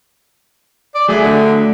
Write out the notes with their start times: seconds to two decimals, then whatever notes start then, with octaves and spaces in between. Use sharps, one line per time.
0.95 D5
1.08 F#3 A3 G#4
1.23 D3